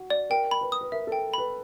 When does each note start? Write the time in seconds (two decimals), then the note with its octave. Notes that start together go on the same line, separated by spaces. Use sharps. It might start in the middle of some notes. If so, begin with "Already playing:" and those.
Already playing: F#4
0.10 D5
0.30 A#4 G5
0.51 B5
0.61 B4
0.72 D#6
0.81 B4
0.92 A#4 E5
1.07 A4 G5
1.34 B4 B5